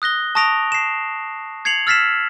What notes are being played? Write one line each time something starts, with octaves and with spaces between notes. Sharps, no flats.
D#6 F#6 A#6 G7
A5 C#6 D#6 A#6 D7 F7
C7 E7
G#6 C7 C#7 F7 F#7
E6 F6 A6 B6 C7 E7